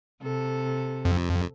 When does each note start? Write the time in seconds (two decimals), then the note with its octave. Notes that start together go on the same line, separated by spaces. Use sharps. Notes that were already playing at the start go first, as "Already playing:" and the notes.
0.21 C3 A4
1.05 F2